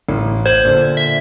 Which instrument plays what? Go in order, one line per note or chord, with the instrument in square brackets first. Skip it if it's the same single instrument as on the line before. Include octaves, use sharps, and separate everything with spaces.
[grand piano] A1
[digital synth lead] C5 [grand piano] G#6 F#7
[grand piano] A#2 D3
[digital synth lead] E5